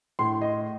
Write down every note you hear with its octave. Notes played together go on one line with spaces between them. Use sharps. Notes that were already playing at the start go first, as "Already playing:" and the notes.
A2 C6
D#5